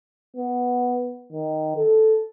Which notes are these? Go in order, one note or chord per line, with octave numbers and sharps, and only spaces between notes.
B3
D#3
A4